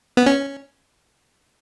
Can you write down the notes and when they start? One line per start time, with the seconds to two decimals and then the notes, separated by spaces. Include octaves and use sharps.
0.17 B3
0.26 C#4